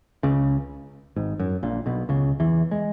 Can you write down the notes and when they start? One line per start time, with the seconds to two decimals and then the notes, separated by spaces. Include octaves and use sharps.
0.23 C#2 C#3
1.16 G#1 G#2
1.40 F#2
1.63 A#1 A#2
1.86 B1 B2
2.09 C#2 C#3
2.40 E2 E3
2.71 G#3